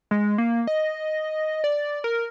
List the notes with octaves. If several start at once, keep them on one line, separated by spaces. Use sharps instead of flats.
G#3
A#3
D#5
D5
A#4